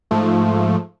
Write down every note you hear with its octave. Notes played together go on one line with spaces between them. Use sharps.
G#2 F3 A3